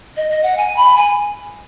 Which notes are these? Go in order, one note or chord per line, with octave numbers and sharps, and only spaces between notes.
D#5
D#5
F#5
G#5
B5
G#5